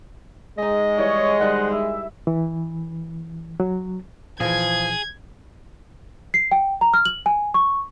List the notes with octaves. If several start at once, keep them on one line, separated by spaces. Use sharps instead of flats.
G#3 D#4 G#4 D#5
E3 G3 C#5 G5
D#3 G3 C5 F#5
E4 E5
E3
F#3
A#2 E3 F3 G#4 G#6
C7
G5
A#5
F6
F#7
G#5
C#6